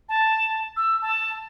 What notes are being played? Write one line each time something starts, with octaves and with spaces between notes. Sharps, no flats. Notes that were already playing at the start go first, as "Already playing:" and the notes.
A5
E6
A5